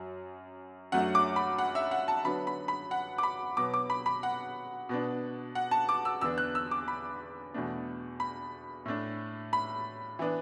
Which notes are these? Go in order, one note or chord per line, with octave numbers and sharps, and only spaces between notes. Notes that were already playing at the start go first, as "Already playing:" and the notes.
Already playing: F#2 F#3
F#2 F#3 A3 D4 F#5
D6
B5
F#5
E5
F#5
A5
D3 F#3 B3 D4 B5
B5
B5
F#5
D6
B5
B2 F#3 B3 D6
D6
B5
B5
F#5
B2 B3 D4
F#5
A5
D6
E6
E2 D3 B3 D4 E6
F#6
E6
D6
B5
E2 B2 A3 D4
B5
A2 A3 D4
B5
E3 B3 D4